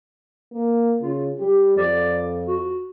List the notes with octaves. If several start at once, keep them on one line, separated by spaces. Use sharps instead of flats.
A#3
C#3 F4
G3 G4
F2 D5
F#4